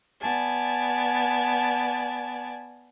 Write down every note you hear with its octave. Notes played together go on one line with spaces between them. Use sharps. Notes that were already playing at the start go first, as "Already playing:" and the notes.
B3 D5 G#5 A5